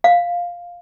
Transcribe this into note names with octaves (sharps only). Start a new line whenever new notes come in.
F5